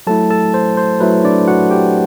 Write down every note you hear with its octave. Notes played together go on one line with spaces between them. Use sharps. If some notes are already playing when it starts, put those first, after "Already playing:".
F#3 A3 E4 A4 A5
A4 A5
C5
C5
F#3 A3 E4 B4
D4 D5
F#4 F#5
G4 G5